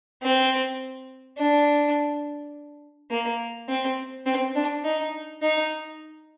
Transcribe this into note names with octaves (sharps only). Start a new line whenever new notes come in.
C4
D4
A#3
C4
C4
D4
D#4
D#4